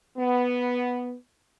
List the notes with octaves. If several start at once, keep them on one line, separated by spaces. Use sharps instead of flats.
B3